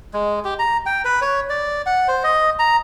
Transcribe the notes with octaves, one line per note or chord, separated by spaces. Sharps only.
G#3
G4
A#5
G5
B4
C#5
D5
F#5
C5
D#5
A#5